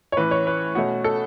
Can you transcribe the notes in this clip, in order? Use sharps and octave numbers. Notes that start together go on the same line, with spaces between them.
C#5
A2 E3 C#4 B4
C#5
B4
B2 A3 C#4 F#4
A4